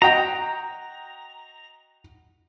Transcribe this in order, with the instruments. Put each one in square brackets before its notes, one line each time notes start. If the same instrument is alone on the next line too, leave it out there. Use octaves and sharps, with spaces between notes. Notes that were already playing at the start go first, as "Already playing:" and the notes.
[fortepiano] F#4 D#5 G5 [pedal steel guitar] A#5